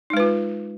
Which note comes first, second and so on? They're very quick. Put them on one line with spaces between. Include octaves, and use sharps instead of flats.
D#4 G#3 B4 F4